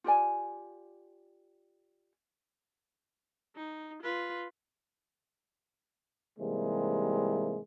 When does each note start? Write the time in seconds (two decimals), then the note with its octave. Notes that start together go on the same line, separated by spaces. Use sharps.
0.04 F4 G4 D5 G#5
3.56 D#4
4.02 F4 B4
6.39 G#2 C3 E3 G3 G#3 A#3